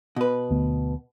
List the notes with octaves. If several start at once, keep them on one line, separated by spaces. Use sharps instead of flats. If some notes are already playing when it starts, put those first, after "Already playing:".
B2 B4
D2 A3 B3